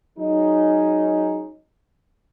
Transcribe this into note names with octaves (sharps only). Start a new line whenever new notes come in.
F#3 G#3 C#4 D#4